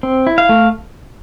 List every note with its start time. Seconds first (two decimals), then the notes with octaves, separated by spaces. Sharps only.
0.03 C4
0.27 E4
0.38 F5
0.49 A3